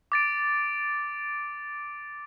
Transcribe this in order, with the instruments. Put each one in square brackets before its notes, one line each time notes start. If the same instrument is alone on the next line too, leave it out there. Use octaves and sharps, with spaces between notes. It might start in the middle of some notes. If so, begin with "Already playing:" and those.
[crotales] D6 A6 D7